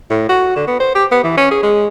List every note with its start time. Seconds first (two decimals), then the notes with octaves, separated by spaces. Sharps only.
0.10 A2
0.29 F#4
0.56 D3
0.67 B3
0.80 C5
0.95 G4
1.12 B3
1.24 E3
1.38 C#4
1.51 G#4
1.63 G#3